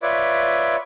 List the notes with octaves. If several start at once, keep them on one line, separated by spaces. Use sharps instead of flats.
F4 B4 C#5 D5 E5